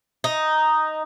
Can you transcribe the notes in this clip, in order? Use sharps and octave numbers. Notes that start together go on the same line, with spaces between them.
D#4